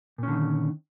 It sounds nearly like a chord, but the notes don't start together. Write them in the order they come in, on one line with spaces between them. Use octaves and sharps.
A#2 C#4 D3 D#3